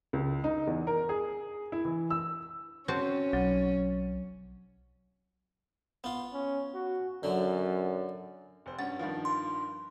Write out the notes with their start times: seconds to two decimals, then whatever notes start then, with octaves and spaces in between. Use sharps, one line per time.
0.13 C#2
0.44 D#4
0.67 E2
0.87 A#4
1.09 G#4
1.72 E4
1.85 E3
2.10 E6
2.88 C4 C#4 F#4 A5
3.33 B1 F#3
6.04 B3 F4
6.33 C#4
6.74 F#4
7.23 F#2 D3 F#3
8.66 F1 C5
8.79 G2 C#4 F#5 A6
8.99 G2 D#3 F3
9.25 C6